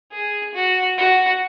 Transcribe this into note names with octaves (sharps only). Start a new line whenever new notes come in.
G#4
F#4
F#4